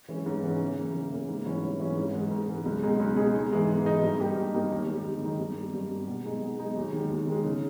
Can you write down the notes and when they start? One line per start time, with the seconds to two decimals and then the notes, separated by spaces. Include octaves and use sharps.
0.09 E3 G#3 C#4
0.26 G#2
0.43 E3 G#3 C#4
0.60 C#3
0.77 E3 A#3
0.94 C#3
1.11 E3 A#3
1.28 G#2
1.45 E3 G3 C#4 E4
1.63 G#2
1.79 E3 G3 C#4 E4
1.96 G#2
2.13 E3 G#3
2.31 G#2
2.48 E3 G#3
2.66 C#2
2.82 B2 G#3 D#4 G#4
3.00 C#2
3.17 B2 G#3 D#4 G#4
3.34 G#2
3.51 E3 G#3 D#4
3.68 G#2
3.85 E3 G#3 D#4
4.02 G2
4.19 G3 A#3 D#4 G4
4.36 G2
4.53 G3 A#3 D#4 G4
4.71 D#2
4.88 D#3 G#3 D#4
5.05 D#2
5.22 D#3 G#3 D#4
5.39 G2
5.56 G3 A#3
5.74 G2
5.90 G3 A#3
6.08 B2
6.25 G#3 D#4 G#4
6.41 B2
6.59 G#3 D#4 G#4
6.76 D#2
6.93 D#3 G#3
7.10 D#2
7.27 D#3 G#3
7.45 C#3